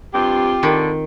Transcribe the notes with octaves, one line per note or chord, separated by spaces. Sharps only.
G2 C4 F4 G4
D3 D#3